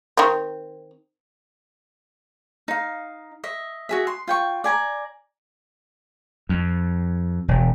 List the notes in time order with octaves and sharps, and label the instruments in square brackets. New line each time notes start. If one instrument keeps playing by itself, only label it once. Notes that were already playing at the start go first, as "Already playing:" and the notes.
[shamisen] D#3 C4
[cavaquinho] D#4 F5
D#5 E5
F#4 G#4 E5
C6
F4 G5 C#6
D5 G#5 A#5
[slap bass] F2
E1